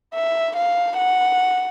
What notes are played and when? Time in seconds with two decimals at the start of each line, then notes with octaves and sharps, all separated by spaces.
0.14 E5
0.56 F5
0.97 F#5